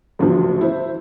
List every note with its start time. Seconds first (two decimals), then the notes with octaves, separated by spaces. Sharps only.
0.19 A1 D2 C#3 F3 F#3
0.61 E4 C5